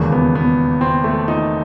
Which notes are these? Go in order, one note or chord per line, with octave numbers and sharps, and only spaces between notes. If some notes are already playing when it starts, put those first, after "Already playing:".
Already playing: E1 D#2 C#3 E3 A#3
B3
B3
C4
A3
D#4